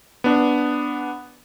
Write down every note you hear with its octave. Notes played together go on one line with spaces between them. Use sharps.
B3 D4